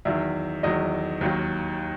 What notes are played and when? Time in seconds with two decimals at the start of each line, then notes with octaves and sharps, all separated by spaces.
0.05 E2 D#3 F#3 E5
0.63 E2 D#3 F#3 D#5
1.21 D#2 D#3 F#3